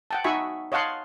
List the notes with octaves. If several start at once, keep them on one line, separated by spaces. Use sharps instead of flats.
F#5 G5 A5
D#4 F#4 E5 G#5 B5 C#6
C#5 D#5 F5 F#5 A5 C6